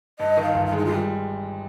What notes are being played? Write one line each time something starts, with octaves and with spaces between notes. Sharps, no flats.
G2 D#5
D#3
F5
G1
F5
G#3
D#4
F4
G3